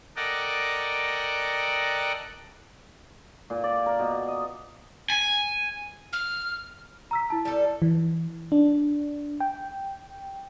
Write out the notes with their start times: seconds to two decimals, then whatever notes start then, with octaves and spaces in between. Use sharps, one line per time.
0.16 A4 A#4 D5 D#5 F#5 G5
3.50 A#2
3.64 D5
3.86 A#4
3.99 B2
4.28 D#5
5.10 G#5
6.13 F6
7.11 A#5 E6 B6
7.30 E4 A5
7.45 G3 A4
7.82 E3
8.52 D4
9.40 G5